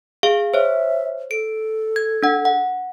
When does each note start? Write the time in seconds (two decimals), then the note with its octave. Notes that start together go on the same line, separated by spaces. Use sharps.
0.23 G#4 F5
0.54 C5 C#5 E5
1.31 A4 D7
1.96 G#6
2.23 D4 F#5
2.45 F#5